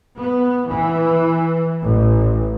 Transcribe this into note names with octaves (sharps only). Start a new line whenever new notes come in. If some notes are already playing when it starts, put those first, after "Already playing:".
B3
E3
A1